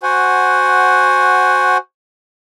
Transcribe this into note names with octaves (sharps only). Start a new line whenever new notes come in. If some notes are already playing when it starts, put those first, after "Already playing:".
F#4 C5 F#5 G#5